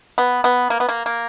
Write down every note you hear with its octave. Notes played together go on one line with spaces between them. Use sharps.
B3
B3
A#3
B3
A#3
A#3